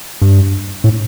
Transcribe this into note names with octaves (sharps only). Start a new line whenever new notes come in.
G2
A2